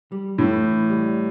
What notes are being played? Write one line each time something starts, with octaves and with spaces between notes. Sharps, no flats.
G3
A2 E3
E3
G3